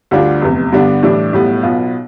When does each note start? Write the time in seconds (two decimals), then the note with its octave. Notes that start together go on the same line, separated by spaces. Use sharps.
0.11 D2 D3 G3 D4 F4
0.42 F1 E2 C3
0.72 G2 D3 G3 B3 D4
1.03 A2 E3 G3 D4
1.33 B1 A2 G3 B3
1.63 B1 B2 B3 F4